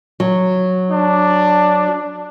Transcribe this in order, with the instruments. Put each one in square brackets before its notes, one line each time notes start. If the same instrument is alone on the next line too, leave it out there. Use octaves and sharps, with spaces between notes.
[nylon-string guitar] F#3
[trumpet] D4